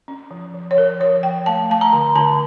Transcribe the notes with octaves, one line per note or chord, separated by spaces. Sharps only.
C#4
F3
F3
C#5
F3 A#4
F3 C#5
F3 G5
A3 A5
A3 A5
A#5
D3
D3 A5